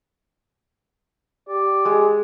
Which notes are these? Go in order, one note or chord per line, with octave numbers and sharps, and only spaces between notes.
G4 D5
G#3